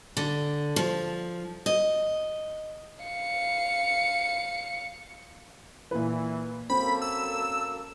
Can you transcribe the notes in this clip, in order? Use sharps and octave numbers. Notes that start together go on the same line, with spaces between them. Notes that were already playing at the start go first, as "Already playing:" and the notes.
D3
F3
D#5
F5 C#7
A#2 E3 B4
F#2 A#3 C4 A4 B5
E6